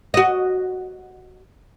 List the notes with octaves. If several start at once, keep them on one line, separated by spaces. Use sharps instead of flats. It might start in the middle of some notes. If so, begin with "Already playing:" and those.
F#4 D#5